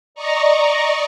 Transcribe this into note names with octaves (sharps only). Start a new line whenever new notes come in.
D5 D#5 A#5 C#6